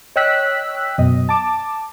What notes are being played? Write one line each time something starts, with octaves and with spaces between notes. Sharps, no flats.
C#5 D#5 G5 E6 F#6 B6
F#2 B2 D#5
A5 D6